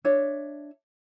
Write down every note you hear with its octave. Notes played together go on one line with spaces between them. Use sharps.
D4 C#5 E5